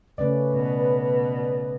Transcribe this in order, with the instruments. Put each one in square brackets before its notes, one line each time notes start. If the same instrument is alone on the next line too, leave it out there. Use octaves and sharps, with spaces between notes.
[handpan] C#3 A3 C#4 [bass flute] B4 [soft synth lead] D5
[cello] B2